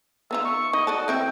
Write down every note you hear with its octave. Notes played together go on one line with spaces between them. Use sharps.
B3 D#4 F4 E5
C#6
D#4 D#5
F#4 D5 D#5 A5
E3 C4 E5 G5